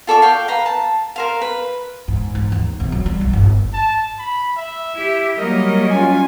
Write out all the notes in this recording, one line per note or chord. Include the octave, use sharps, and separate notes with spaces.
F4 A4 D5 C#6
F5 G5
B4 F5 A#5
A5
A#4 C5 F5
B4
G#2
G#2
D#2
C3
F#3
G3
B1
G1
A5
B5
E5
E4 G4
F#3 G3 A#3 A#4 D#5
C#4 F4 G#5